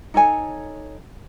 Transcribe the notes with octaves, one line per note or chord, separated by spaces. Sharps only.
D#4 A4 C#5 G#5